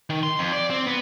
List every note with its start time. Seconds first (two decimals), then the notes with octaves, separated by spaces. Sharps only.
0.10 D#3
0.23 C6
0.39 F2
0.53 D5
0.70 C4
0.87 B3